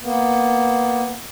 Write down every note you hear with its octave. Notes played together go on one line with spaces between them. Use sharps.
A#3 B3